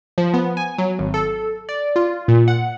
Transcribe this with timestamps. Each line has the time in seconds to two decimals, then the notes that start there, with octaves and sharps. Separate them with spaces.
0.18 F3
0.34 B3
0.57 G#5
0.78 F#3
0.99 G#1
1.14 A4
1.69 D5
1.96 F4
2.28 A#2
2.48 F#5